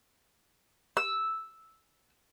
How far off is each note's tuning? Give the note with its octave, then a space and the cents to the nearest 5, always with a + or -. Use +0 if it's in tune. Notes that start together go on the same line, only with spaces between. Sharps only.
E6 -5